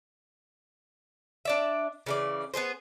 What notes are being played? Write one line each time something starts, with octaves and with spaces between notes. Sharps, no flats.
D4 D5 E5
C#3 E3 D5
B3 C4 G#4 C5